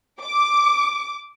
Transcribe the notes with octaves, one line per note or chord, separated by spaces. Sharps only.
D6